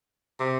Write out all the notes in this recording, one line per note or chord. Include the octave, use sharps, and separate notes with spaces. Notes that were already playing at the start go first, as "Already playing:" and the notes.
C3